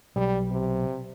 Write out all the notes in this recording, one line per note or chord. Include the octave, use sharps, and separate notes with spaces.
B1 G3
C3